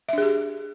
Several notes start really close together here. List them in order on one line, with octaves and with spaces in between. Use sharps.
E5 D4 G#4 G4